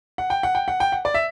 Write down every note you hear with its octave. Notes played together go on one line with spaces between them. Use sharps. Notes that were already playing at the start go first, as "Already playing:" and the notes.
F#5
G5
F#5
G5
F#5
G5
F#5
D5
E5